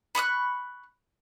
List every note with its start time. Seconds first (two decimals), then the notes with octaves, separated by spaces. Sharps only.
0.15 B5 C#6 D#6 F#6